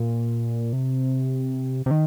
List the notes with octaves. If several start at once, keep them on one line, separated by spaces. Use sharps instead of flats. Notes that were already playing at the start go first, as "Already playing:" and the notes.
Already playing: A#2
C3
C3
D#3